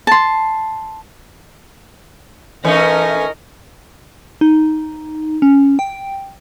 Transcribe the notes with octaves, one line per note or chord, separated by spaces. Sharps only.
A5 C6
E3 A3 C#4 D#4 A#4
D#4
C#4
G5